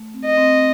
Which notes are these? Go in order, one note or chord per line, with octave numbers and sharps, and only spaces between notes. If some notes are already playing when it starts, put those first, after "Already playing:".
Already playing: A3
C4
D#5
C4